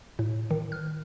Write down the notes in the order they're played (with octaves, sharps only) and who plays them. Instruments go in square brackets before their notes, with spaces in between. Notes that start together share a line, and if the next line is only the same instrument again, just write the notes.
[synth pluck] A2
D#3
F6